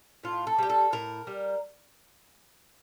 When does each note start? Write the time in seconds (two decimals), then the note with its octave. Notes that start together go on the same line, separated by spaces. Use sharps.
0.23 A2 F4
0.47 A4
0.58 G3 G4
0.70 A4
0.93 A2 A#4
1.27 G3